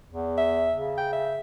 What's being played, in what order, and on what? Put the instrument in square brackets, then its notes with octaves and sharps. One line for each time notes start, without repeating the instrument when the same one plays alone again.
[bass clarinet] E2
[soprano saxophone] E5
[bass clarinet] C#3
[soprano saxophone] G5
E5